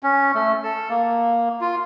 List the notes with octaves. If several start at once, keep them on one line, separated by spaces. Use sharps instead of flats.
C#4
A3
A4
A#3
F4